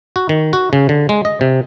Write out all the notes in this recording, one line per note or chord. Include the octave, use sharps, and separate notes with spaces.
F#4
D#3
F#4
C#3
D3
G#3
D#5
C3